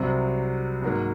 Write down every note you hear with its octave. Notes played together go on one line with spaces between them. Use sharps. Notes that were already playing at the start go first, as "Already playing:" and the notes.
Already playing: C2 C3 F#3 C4
G#2 F#3 A#3